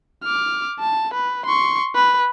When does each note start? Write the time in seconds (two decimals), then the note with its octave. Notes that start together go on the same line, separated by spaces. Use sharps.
0.23 D6 F6
0.79 A5
1.14 B4
1.46 C6 C#6
1.95 B4